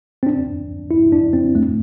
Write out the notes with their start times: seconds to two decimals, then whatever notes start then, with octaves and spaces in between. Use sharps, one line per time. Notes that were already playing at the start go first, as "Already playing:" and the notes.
0.23 C4
0.26 D4
0.91 E4
1.12 D4
1.33 C4
1.55 A3